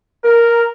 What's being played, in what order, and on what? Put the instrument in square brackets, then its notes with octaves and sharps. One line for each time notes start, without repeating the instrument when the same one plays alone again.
[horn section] A#4